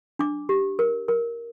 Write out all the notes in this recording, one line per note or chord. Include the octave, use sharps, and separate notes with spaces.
D4 D6
G4
A#4
A#4